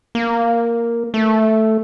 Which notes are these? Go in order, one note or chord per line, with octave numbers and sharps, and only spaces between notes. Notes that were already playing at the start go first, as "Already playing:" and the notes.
A#3
A3